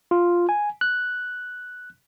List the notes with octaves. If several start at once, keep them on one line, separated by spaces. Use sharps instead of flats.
F4
G#5
F#6